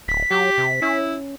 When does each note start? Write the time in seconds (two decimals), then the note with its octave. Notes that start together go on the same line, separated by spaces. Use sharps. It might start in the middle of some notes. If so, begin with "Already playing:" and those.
0.08 D1 B6
0.31 F#3 G4
0.58 C3
0.82 C#4 E4